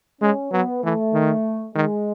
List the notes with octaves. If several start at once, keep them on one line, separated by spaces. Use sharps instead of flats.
G#3 C#4
F#3 B3
E3 A3
D#3
D#3 G#3